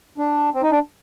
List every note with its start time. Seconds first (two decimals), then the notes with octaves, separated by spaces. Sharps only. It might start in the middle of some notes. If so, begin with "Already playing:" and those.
0.18 D4
0.54 C4
0.62 D#4
0.71 D4